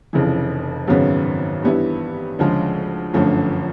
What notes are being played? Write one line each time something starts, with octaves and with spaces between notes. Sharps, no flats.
F1 F2 C#3 E3
G#1 F#2 C#3 F#3 B3
G2 E3 G3 B3 E4
D2 C#3 F3 G#3
G1 F#2 D3 F3 A3